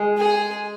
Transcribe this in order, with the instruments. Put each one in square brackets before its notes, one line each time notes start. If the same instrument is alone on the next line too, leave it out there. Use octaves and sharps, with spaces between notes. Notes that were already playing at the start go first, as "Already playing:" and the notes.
Already playing: [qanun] G#3
[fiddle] G#4